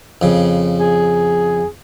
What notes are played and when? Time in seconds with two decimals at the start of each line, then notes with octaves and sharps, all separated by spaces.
0.21 F2 C#3
0.80 G#4